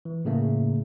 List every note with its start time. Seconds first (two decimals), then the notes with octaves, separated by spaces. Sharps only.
0.05 E3
0.25 A2 C#3 A3 A#3